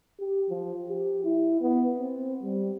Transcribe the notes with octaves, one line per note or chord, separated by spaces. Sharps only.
G4
F3
G4
E4
B3
C4
G3